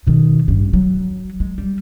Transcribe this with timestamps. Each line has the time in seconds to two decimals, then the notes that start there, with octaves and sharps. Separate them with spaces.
0.07 B2 D#3
0.48 A1 G2
0.73 F#3
1.40 G#3
1.58 G3